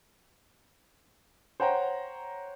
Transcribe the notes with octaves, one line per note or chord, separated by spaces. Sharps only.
C5 C#5 F#5 G5 A#5